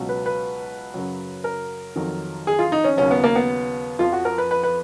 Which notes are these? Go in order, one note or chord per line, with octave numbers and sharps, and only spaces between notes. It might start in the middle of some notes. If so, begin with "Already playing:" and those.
Already playing: C#2 B2 F#3
B4
B4
F#2 C#3 F#3
A#4
F2 D#3 F#3
G#4
F4
D#4
C#4
D#2 C#3 F#3 C#4
B3
A#3
B3
F2 F3 F4
F#4
A#4
B4
B4
B4